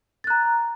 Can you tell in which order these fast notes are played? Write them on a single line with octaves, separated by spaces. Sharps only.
A6 F#6 A#5